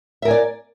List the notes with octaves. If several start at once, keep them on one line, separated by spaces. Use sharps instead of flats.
A#4 D5 E5 G#5